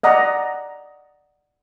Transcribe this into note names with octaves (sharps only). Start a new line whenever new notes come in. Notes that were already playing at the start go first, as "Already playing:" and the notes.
D5 D#5 F#5 A#5